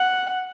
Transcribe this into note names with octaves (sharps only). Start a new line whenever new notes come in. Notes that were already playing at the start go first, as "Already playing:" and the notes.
Already playing: F#5